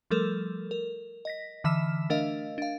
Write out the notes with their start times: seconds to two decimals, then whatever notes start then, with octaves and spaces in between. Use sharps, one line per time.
0.11 F3 G3 A3 A4 A#4
0.71 A#4
1.25 D#5 A#6 B6
1.64 D3 E3 E5 F6 B6 E7
2.10 A3 D4 A#4 D#5 F5
2.58 D4 F5